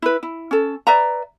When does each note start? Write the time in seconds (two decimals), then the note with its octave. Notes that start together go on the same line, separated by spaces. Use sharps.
0.02 E4 B4
0.23 E4
0.51 C#4 A4
0.87 B4 D5 E5 A#5